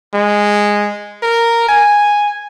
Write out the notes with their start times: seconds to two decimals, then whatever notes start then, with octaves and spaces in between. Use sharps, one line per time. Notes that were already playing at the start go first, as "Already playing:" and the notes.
0.14 G#3
1.23 A#4
1.69 G#5